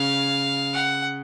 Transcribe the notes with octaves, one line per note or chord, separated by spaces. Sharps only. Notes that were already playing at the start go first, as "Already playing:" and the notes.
Already playing: C#3 F5
F#5